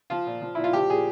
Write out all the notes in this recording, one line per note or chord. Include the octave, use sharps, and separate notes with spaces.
F3 F4
A#2
F3
A#2 E4
F4
F3 G4
A#2 G#4